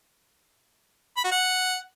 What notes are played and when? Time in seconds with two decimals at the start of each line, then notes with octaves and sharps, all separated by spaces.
1.17 B5
1.24 F#4
1.31 F#5